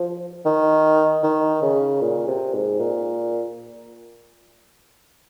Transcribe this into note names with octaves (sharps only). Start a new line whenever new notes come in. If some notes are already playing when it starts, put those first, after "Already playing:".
Already playing: F3
D#3
D#3
C#3
A#2
C3
G#2
A#2